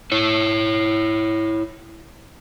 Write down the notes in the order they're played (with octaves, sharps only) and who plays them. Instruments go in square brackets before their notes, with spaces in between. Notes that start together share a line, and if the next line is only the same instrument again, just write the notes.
[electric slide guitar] E4 C#5